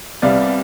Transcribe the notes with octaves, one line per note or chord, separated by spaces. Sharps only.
C2 C3 G3 B3 D5 F5